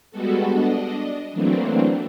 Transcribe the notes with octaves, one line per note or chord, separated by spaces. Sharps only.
G3 G#3 B3 F#4 A4
D4 D#5
E3 F#3 A3 A#3 C4 D4